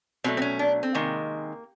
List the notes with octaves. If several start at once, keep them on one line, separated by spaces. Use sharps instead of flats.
B2 F#3 A3 C4
C4
C#4
D4
C4
C3 D#3 G#3 A#3